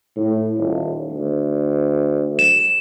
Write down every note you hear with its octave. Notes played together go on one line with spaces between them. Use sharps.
A2
D#1
D2
E7